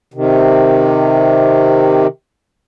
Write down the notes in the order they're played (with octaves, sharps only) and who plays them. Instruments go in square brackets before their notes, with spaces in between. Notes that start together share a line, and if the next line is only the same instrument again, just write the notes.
[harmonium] C3 D#3